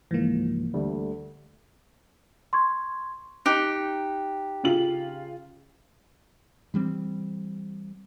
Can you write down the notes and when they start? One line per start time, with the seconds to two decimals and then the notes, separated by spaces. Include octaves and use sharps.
0.11 C#2 G#2 E3 F3 A#3
0.74 D2 G3 A3
2.53 C6 C#6 G#6
3.46 D#4 G4 D6 F#6 D7
4.63 C#3 F4 F#7
6.74 E3 G3 A3 C4